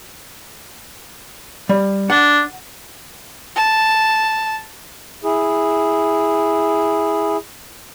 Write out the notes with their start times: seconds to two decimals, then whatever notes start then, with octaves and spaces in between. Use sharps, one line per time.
1.69 G3
2.10 D4 F#5
3.56 A5
5.24 E4 G#4